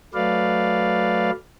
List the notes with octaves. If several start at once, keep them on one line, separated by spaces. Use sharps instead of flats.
F#3 A3 B4 D5 F5